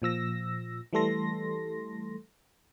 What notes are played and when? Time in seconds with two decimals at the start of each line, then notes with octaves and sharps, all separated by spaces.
0.02 A#2 F3 E6 A#6
0.93 E3 G3 A3 A4 C6 A#6